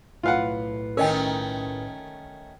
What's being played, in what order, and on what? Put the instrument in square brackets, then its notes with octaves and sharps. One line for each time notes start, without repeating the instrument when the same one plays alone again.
[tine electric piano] B1 A2 B4 [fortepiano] F4 F5 F#5
[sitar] D#3 A3 C#4 [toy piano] A#4 D#5 G5